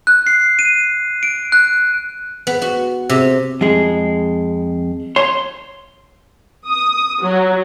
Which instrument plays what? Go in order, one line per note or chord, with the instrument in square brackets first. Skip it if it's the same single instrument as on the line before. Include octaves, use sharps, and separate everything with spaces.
[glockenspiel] F#6
C7
D#7
D7
F#6
[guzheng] B3
F#4
C3
[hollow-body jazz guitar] F2 G#3
C#5 C6
[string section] D#6
F#3